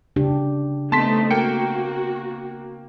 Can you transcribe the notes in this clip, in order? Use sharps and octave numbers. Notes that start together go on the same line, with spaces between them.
C#3 D4 G4
A3 B3 C4 D#4 A5 C6 B6
A#3 F#4 G5 C#7